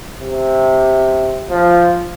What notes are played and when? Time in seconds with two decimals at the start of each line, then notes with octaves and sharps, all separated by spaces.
0.18 C3
1.50 F3